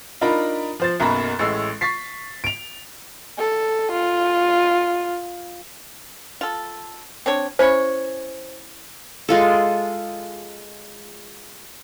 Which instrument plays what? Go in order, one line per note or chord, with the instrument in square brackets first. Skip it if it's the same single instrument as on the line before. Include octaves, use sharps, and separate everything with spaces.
[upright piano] D4 D#4 F4 A#4 A#5 B5
F3 C5 A6
B1 F#2 B2 A#3 A#5 B5
A1 A2 G#3 E6 C7
C#6 A6 B6 C7
D7 F7
[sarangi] A4
F4
[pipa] F4 A4
C4 D4 C#5
[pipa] C#4 E4 C#5 [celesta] C5
[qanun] G#3 F4 A4